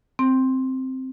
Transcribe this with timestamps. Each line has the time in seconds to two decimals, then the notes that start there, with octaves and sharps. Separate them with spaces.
0.19 C4